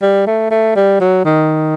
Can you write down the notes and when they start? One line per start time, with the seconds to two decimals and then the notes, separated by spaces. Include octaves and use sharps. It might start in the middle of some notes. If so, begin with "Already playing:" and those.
0.02 G3
0.27 A3
0.51 A3
0.76 G3
1.01 F#3
1.25 D#3